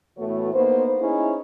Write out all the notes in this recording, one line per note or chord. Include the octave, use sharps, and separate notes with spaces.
A2 E3 A3 B3 F#4 C#5
A#3 B3 D#4 C5
C#4 D#4 E4 G#4